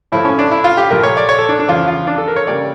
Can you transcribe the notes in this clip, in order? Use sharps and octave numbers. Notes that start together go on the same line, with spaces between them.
A2 F3 A3 E4
C#4
D4
E4
F4
G4
A#1 A#2 A3 A#4
C#5
D5
C#5
A4
D4
D4
E2 C#3 F3 F4
F4
D4
A4
A#4
C#5
C#3 G3 A#3 D5